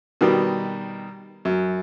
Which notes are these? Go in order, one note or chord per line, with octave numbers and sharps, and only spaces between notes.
B2 D#3 G3
F#2